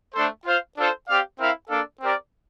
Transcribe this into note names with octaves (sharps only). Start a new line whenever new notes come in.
A3 D4 A4 C5
F4 C5 F5
D4 F4 A4 C5
C4 G4 D5 F5
C4 E4 A#4 F5
A#3 D4 A4 D5 F5
C4 G4 A#4 D5